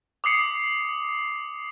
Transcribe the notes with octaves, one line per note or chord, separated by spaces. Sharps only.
D6 D#6 C7 C#7